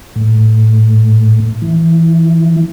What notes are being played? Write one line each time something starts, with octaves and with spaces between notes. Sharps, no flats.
A2
E3